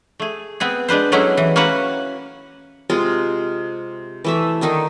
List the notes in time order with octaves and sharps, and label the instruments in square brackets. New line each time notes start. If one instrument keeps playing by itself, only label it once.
[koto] A3 G#4
B3 C4 G#4
G#3 D4 B4 C5
F#3 G#3 A3 B3 C#4 E4
E3
A#3 C#4 F#4 B4 F#5
[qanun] C3 G#3 F4
E3 A3 E5
D3 D#3 D#4